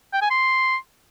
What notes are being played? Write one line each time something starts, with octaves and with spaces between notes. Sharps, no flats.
G5
G#5
C6